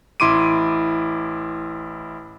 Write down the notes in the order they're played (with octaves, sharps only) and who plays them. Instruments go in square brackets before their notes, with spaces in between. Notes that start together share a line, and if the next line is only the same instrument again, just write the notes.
[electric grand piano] A1 E4 C6 D6 D7 D#7